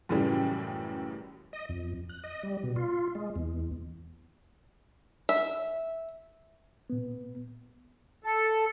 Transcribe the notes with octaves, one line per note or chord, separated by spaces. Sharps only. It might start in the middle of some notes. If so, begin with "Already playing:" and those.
F#2 A2 C#3 E3 G3
D#5
F2
F#6
D#5
G3
B2
F4
G#3
E2
E5
A#2 B3
A4